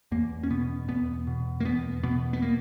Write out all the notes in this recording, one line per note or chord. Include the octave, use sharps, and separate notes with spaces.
E2 A#3
C#4
B2 B3
E2 B3
B2
A#3
E2 B3
B2 B3
B3
A#3